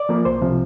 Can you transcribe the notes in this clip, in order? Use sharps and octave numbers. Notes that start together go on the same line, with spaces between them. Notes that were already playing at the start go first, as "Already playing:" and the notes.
Already playing: D5
F3 A#3
C2 C5
C3 F3